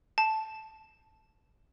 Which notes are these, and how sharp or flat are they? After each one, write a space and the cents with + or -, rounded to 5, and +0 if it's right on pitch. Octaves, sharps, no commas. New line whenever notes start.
A5 -5